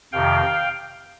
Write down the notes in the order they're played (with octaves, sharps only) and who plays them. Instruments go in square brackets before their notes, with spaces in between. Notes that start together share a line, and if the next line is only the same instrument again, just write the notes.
[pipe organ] F2 C3 D#3 F5 G5